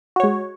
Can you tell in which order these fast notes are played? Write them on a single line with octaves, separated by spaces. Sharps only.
F#4 C#5 G#3